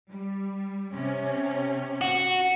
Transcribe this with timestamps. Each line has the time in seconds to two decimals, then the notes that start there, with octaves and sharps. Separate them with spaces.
0.11 G3
0.92 C3 C#4
2.01 F#4